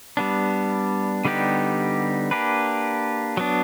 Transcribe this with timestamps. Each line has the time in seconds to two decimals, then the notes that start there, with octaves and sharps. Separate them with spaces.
0.17 G3 B3 D4
1.25 D3 G3 B3 D#4 G4
2.31 A#3 D4 G4 B4
3.37 F#3 B3 D4